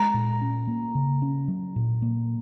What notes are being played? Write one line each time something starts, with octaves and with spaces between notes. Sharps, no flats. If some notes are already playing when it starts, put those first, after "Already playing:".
Already playing: G#3 A#5
A#2
C#4
A#3
C#3
C#4
F#3
A#2
A#3